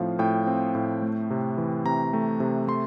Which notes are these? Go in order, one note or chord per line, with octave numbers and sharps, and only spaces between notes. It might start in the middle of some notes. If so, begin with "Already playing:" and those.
Already playing: A2 F3 C4 F5
A2 G5
C4
A2
A3
C3
E3
C3 A#5
A3
C3
A3 C6